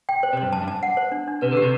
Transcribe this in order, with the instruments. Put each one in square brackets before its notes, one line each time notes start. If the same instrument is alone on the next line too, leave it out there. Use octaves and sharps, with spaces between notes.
[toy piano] G5
C5
[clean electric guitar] C3
[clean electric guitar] G2 [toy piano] C5
[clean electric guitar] F#2 [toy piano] A5
[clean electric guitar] G2
[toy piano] A5
F#5
C5
D4
D4
[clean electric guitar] C3 [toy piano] B4
[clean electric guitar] D3
[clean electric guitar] C3 [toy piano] G4